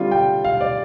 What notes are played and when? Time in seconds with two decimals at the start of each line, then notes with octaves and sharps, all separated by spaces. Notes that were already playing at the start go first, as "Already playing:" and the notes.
Already playing: D3 G3 C4 F4
0.11 G5
0.45 F5
0.61 D5